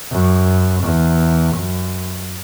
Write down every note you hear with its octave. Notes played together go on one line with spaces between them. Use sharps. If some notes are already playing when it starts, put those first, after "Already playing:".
F#2
E2
F#2